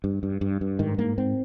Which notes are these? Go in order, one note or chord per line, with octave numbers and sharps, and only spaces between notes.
G2
G2
G2
G2
G#2 D#3
G#2 A#3
G#2 C4